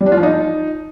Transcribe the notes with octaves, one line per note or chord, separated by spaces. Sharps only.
G3
D4
F4
F3
D#4